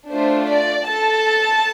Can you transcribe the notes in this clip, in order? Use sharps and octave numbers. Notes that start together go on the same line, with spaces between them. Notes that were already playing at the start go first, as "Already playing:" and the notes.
A3 D4 F4 C5
D5
A4 A5